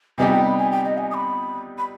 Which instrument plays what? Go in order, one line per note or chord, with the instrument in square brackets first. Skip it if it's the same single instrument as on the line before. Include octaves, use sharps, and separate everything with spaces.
[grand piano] C3 G3 B3 D#4 G4 [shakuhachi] G#5
[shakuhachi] G5
B5
G#5
G5
D#5
G#5
D#6
B5
B5